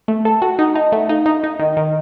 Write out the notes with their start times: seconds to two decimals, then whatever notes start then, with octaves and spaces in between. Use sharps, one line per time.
0.08 A3
0.25 A4 A5
0.42 F#4 F#5
0.59 D#4 F#5
0.75 D#4 D#5
0.92 A3 F#5
1.09 D#4 F5
1.26 D#4 D#5
1.44 D#4
1.59 D#3 D#5
1.77 D#3